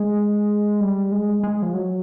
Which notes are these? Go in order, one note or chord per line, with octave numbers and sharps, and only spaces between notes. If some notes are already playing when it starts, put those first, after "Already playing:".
Already playing: G#3
G3
G#3
G#3
F3
F#3